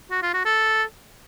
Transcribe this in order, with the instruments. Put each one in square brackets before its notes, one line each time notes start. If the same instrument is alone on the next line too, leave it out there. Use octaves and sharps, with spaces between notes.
[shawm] F#4
F4
F#4
A4